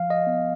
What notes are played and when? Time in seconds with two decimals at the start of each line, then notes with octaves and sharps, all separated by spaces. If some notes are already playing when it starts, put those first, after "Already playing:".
Already playing: F3 F5
0.10 D#5
0.27 B3